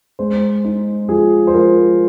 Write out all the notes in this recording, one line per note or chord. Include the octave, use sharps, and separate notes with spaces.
G#3 C5
D#4
F3 G#4
C5
F3 A#4